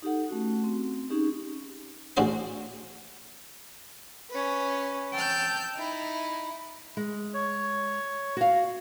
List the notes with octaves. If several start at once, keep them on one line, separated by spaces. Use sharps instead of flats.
D#4 G4 A4 F#5
A3 C#4 F#4
C4
C#4 D#4 G4 G#4
A1 C#3 D4 F#4 C5 C6
C#4 B4
G5 A5 E6 F6 G6
D#4 E4
G#3
C#5
F#4 F5